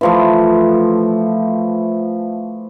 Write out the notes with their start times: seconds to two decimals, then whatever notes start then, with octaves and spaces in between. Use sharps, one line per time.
0.01 E3 F3 A3